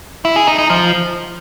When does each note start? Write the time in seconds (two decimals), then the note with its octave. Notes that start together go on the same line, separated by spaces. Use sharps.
0.25 E4
0.36 G#4
0.47 D#4
0.58 D#4
0.70 F3